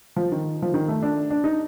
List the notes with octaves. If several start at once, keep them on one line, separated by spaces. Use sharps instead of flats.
F3
D#3
F3
D#3
A3
D4
D4
D#4